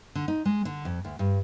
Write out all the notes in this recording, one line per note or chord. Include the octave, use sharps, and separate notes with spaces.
D3
D#4
G#3
D3
F2
D2
G2